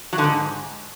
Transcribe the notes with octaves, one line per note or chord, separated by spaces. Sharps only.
F#3
D3
G#2